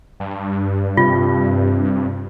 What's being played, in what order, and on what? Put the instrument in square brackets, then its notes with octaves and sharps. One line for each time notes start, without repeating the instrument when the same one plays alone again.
[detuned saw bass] G2
[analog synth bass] C3 [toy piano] F4